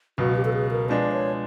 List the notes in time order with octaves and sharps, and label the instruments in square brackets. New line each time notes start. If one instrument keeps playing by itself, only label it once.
[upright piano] C#2 B2 F#3 [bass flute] F#4
[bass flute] G4
A4
G#4
A#4
[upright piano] F3 G#3 B3 D4 [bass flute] D5
[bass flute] C#5